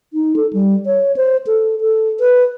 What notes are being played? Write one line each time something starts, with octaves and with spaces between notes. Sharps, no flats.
D#4
A4
G3
C#5
C5
A4
A4
B4